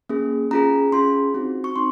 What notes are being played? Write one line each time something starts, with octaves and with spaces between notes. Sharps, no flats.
A#3 C#4 G#4
C#4 F4 G#4 A#5
C#4 F4 G#4 C6
C4 D#4 F#4
C#6
C4 D#4 C6